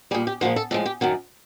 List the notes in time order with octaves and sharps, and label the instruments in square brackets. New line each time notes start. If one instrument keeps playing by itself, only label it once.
[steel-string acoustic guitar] G3 G#4
A#2
G4
A#2 F3 G#3 F#4
A4
A2 F3 G#3 A4
G4
F#2 D#3 F#3